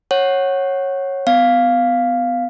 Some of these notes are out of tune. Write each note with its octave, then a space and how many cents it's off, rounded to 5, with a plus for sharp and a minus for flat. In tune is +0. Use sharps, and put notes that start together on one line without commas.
C#5 -15 F#5 +0
B3 +30 F5 +0